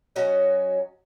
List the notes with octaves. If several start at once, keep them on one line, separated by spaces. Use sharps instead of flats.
F#3 C#4 F#4 D#5